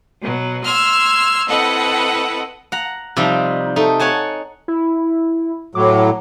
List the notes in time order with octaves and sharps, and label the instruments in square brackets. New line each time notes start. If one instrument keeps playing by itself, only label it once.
[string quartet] B2 F#3
C6 E6 F6 G#6
C4 E4 A4 B4 D#5 F#5
[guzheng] F#5 A#5
C3 F3 G3 D#4
A3 D#4
C#5 F#5 G#5 A5
[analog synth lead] E4
[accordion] A2 F#3 [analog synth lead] D6